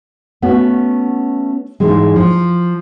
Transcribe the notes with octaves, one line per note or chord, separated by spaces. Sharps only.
A3 B3 C#4 F#4
G#2 E3 G#3
F3